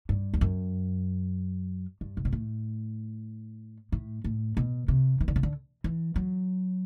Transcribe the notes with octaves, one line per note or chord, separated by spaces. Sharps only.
G2
E2
F#2
G2
C3
B2
A2
A2
A2
B2
C3
E3
D3
C3
D3
E3
F#3